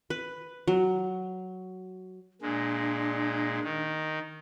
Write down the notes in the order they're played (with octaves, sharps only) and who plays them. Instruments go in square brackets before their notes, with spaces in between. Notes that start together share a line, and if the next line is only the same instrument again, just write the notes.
[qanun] B4
F#3
[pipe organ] A#2 G#3 [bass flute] D4
[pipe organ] D#3